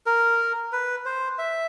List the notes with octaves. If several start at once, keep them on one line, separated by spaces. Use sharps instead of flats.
A#4
B4
C5
E5